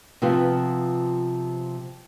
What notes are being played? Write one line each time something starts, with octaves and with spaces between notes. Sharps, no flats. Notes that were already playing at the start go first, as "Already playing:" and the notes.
C3 F3 B3 F4 G4